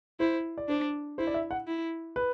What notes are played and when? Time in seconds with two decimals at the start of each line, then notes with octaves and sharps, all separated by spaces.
0.20 E4 C5
0.58 D5
0.69 D4 C5
1.18 E4 C5
1.27 D5
1.34 E5
1.51 F#5
1.67 E4
2.16 B4